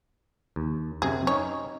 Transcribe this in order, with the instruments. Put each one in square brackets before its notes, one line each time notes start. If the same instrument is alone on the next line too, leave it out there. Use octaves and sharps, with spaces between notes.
[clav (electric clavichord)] D#2
[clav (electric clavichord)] F#2 C3 [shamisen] G#4
[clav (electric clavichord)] C#4 D#4 [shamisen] C#5